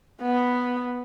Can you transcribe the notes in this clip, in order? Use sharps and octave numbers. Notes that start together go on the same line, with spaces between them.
B3